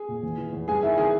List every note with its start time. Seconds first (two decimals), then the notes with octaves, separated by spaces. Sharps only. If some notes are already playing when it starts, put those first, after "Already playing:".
Already playing: G#4 G#5
0.09 A#2
0.23 E2
0.38 E3
0.53 E2
0.68 G2 G#4 G#5
0.83 D#3 E4 E5
0.98 D#3 G#4 G#5